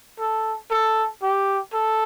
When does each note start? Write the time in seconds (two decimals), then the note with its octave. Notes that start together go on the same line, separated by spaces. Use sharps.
0.19 A4
0.71 A4
1.22 G4
1.73 A4